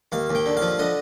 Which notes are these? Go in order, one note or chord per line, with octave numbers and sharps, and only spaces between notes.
D#2 F5
D#2
G5
D3
F3 F5
D3 D#5